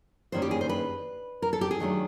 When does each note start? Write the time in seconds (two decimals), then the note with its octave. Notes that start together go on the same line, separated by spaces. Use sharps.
0.32 G2 D#3 G3 A#3 C#4 C5
0.42 G4
0.51 G#4
0.61 C5
0.69 B4
1.42 A#4
1.53 A4
1.61 G4
1.71 G#4
1.80 D#3 F#3 A3 D4